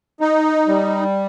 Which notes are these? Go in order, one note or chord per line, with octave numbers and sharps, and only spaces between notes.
D#4
G3